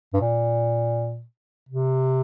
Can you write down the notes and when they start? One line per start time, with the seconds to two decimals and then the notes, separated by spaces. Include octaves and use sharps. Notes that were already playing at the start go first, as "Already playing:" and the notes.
0.14 G2
0.21 A#2
1.69 C3